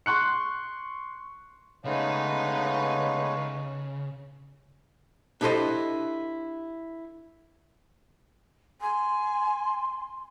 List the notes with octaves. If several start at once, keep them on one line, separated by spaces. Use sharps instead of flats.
C6 C#6 F#6 C#7
C#3 G#3 A3 B3 D#4 B4 C#5 F5
D4 E4 G4 A4 C5 D#5
G#5 C6